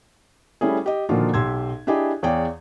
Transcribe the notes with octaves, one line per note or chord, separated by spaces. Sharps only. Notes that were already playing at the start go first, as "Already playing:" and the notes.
G3 A3 C#4 E4 G#4
G4 D#5
A#2 D3 D#3 F3 F4 F#4
B1 G4 C6 E6 G#6
D4 E4 G4 G#4 D#5
E2 G#4 C#5 D5 F5 G5